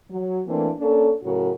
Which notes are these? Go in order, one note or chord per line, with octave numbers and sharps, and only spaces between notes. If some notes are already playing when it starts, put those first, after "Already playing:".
F#3
E3 A3 A#3 C4 D4
A#3 C#4 D4 A4
A2 C#3 F#3 F#4 A#4